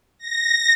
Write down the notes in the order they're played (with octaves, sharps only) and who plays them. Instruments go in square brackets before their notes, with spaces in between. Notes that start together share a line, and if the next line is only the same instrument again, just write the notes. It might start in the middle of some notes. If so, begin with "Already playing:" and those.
[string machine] A#6